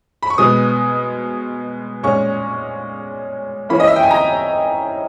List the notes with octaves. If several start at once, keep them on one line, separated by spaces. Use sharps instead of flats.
B5
C#6
B2 G#3 B3 D#6
A#2 G#3 C#4 C#6
E3 A#3 C#4 B5
D#5
E5
G5
G#5
A#5